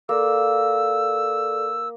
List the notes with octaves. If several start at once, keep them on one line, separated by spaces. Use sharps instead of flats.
A#3 A4 D5 E6